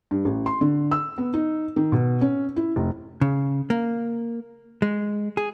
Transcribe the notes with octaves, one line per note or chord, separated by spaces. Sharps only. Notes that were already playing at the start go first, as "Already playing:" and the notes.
G2
A1
C6
D3
E6
B3
D#4
D#3
B2
C#4
E4
F1
C#3
A#3
G#3
G#4